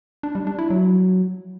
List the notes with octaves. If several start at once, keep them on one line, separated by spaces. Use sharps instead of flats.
D4
G3
D4
E4
F#3